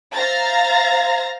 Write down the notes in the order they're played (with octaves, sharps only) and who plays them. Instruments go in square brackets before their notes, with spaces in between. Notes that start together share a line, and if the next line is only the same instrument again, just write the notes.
[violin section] C5 E5 F5 A#5 A6 A#6